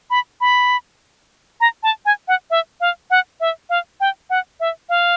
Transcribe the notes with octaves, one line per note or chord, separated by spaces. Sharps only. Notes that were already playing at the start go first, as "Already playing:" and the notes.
B5
B5
A#5
A5
G#5
F#5
E5
F5
F#5
E5
F5
G5
F#5
E5
F5